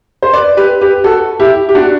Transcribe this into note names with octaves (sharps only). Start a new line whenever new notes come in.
C5
B4 D5
G4 B4
G4 B4
F#4 A4
E4 G4
G4
D4 F#4